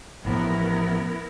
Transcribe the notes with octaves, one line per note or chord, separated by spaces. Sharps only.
A1 A2 F3 B3 E4 A#4